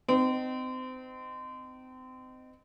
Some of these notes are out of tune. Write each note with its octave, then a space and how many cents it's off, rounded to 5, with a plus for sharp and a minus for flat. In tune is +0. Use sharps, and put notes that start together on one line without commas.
C4 -30 D#4 -20